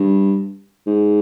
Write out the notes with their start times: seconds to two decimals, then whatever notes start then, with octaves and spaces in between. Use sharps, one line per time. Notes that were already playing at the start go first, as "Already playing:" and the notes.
Already playing: G2
0.87 G#2